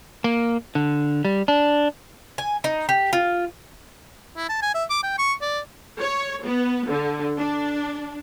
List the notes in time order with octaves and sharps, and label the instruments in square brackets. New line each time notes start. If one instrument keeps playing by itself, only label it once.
[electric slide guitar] A#3
D3
G3
D4
[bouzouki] G#5
D#4
G4
F4
[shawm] E4
A5
G#5
E5
D6
G5
C#6
D5
[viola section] C#5
B3
D3
D4